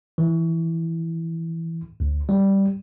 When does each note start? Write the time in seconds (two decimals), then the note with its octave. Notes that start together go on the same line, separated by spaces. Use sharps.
0.18 E3
2.00 D2
2.29 G3